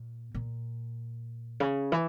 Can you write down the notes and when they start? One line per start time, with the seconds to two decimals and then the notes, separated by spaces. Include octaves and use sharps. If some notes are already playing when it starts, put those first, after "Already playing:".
Already playing: A#2
0.34 A#2
1.60 C#3
1.92 E3